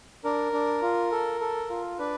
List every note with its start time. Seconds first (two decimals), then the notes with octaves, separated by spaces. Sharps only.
0.24 D4 A#4
0.53 D4
0.82 F4
1.12 A4
1.41 A4
1.70 F4
1.98 D4 B4